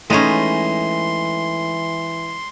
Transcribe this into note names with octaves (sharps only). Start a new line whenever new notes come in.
A2 E3 G#3 C#4 D#4 C6